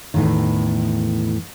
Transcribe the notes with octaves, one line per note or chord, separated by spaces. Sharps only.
E2 A2 D#3